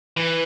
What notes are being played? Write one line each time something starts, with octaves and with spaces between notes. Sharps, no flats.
E3